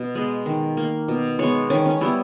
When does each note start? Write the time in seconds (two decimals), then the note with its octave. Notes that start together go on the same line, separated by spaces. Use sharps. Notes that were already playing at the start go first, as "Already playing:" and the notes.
Already playing: B2
0.15 G#3 B3
0.46 D#3
0.77 A#3
1.08 B2
1.39 G#3 B3 C#5
1.70 D#3 C#4
1.86 C#4
2.01 G3 B3 E4